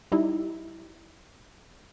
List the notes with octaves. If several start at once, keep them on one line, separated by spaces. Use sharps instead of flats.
G3 D#4 E4